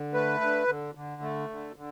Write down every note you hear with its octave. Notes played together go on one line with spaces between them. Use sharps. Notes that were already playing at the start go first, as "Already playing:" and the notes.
Already playing: D3
A3 B4
D3
D3
D3
A3
D3
D3